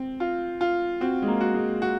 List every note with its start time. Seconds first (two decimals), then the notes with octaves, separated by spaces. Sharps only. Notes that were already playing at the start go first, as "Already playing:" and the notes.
Already playing: C4
0.20 F4
0.61 F4
1.01 C4 F#4
1.22 G#3
1.28 A#3
1.41 F#4
1.54 G#3
1.82 F#4